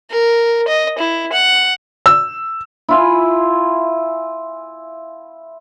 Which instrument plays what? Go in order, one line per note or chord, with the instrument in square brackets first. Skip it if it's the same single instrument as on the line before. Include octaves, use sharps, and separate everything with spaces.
[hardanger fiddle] A#4
D#5
E4
F#5
[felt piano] E6
[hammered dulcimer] E4 F4 G#5